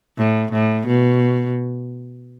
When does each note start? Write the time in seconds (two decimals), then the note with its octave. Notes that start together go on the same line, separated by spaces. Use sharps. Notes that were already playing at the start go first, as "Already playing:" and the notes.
0.18 A2
0.52 A2
0.87 B2